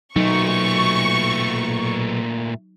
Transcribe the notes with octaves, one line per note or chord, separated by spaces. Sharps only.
B1 A#2 F#3 A3 D#4 C#6